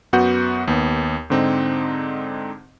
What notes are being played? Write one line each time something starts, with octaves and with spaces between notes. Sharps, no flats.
F#2 B3 F#4 F#5 G6
D#2 B3
G#2 D3 C4 D#4